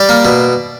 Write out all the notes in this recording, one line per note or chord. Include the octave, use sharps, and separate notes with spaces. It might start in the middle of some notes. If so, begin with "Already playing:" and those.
Already playing: G3 D5
A#3
B2